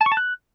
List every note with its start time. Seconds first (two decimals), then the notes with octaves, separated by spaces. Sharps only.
0.01 A5
0.06 C#6
0.12 A5
0.17 F#6